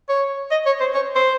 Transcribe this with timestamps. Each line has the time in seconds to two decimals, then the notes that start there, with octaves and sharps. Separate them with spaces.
0.09 C#5
0.51 D#5
0.66 C#5
0.80 C5
0.94 C#5
1.15 C5